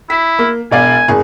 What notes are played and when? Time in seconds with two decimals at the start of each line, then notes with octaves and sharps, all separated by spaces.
0.10 E4 B6
0.39 A#3
0.71 E1 D5 F5 G#5
1.08 F#1 G#4